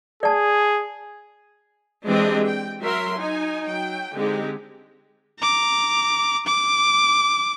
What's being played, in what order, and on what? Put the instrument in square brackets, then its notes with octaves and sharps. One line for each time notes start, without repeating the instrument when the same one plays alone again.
[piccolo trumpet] G#4 [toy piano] D5 A5
[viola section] E3 G#3 C4 D4 G4 D#5
G5
F#3 A#4 E5 C6
D#4 G#5
F#3 G5
D3 G#3 C4 D#4 G4
[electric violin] A#5 D6
D6